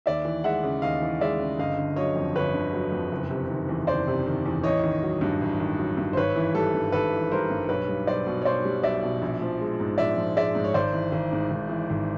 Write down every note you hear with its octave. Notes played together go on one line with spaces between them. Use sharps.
D#2 D5 E5
E3
G#3 E5 F#5
C#3
D#2 D#5 F5
E3
G#3 D5 E5
C#3
G1 D#5 F5
D3
F#3 C#5 D#5
F2
G1 B4 C#5
D3
F#3
F2
F#1
C3
D#3
E2
F#1 C5 D5
C3
D#3
E2
A1 C#5 D#5
D#3
F#3
G2
A1
D#3
F#3
G2
C5
G#1 B4 C#5
E3
G3 A4
G2
G#1 A4 B4
E3
G3 A#4 C5
G2
B1 B4 C#5
G3
B1 C5 D5
B2
C#5
B1 C5 D5
G3
B1 D5 E5
B2
A#1
F3
G#3
G#2
A#1 D5 E5
F3
G#3 D5 E5
G#2
C#5
G#1 C5 D5
E3
G#1
G#2
G#1
E3
G#1